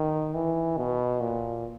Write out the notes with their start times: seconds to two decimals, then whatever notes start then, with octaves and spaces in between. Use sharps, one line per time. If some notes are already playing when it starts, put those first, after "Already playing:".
Already playing: D#3
0.34 E3
0.77 B2
1.20 A#2